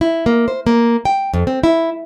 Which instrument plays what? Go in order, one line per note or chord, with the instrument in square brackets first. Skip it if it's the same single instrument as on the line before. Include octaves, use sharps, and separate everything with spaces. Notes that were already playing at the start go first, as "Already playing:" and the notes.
[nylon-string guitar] E4
A#3
C5
A#3
G5
F2
C4
E4